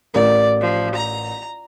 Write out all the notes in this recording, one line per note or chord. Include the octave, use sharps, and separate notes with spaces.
A1 A#4 D5
F3
A#5